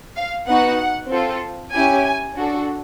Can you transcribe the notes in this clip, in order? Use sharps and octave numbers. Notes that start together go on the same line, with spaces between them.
F5
B3 D#4 F#4 F#5
C4 F4 A4
C#4 E4 G4 G#5
D4 F#4 A4